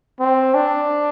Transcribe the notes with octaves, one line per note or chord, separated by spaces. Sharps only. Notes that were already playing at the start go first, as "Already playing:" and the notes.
C4
D4